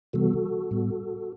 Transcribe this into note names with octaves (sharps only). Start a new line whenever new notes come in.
C3 E3 G3 B3 F#4 A4
A2 G3 B3